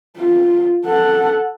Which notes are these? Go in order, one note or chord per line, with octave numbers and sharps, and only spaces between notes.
F4
A4 F#5